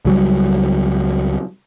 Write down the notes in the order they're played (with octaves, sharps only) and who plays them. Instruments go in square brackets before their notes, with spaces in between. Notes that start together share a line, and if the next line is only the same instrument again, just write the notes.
[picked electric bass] C#2 F#3 G3